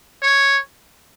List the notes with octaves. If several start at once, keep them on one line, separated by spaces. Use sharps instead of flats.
C#5